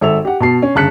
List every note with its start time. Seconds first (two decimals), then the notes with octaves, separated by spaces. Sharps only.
0.01 G#1 A4 E5 F7
0.25 G4 F#5
0.40 B2 A5 C7
0.62 C#4
0.75 G1 C#3 A5 F#6 B6 C#7